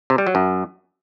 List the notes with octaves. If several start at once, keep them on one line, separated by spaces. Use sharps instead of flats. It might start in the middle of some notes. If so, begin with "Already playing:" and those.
C3
G3
F#3
F#2